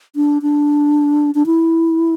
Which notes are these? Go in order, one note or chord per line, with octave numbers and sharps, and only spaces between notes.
D4
D4
D4
E4